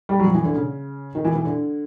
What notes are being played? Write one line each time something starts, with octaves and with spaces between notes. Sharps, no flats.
G3
F#3
F3
E3
D3
C#3
D#3
E3
E3
D3